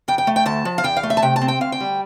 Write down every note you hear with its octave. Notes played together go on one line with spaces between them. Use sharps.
F2 G5
G5
A3
G5
D2 A5
F3
F5
E2 G5
F5
A3
E5
A5
C3 G5
A5
C4
G5
D2 F5
G5
G3